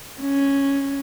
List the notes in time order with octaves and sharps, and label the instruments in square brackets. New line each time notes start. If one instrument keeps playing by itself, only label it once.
[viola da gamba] C#4